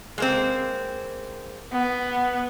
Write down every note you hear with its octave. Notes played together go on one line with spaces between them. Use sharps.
G#3 A#3 C4
B3